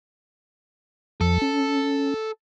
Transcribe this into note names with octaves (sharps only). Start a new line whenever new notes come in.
F2 F3 A4
C#4